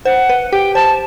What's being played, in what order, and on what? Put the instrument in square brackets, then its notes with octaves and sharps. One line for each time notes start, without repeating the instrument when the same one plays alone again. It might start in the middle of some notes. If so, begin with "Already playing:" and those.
[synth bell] C5 [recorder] F#5
[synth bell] B4
[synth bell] G4 [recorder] G5
[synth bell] C5 [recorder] A5